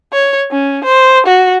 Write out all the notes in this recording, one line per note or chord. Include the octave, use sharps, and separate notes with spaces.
C#5
C#4
C5
F#4